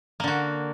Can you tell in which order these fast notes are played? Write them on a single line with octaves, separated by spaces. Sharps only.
A#3 D3 F#4